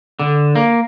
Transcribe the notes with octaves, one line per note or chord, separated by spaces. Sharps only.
D3
A#3